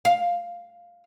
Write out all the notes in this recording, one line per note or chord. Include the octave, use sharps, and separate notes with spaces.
F5